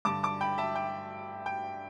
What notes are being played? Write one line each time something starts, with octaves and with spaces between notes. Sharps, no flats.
G2 D3 A5 D6
A5 D6
G5 B5
E5 A5
G5
G5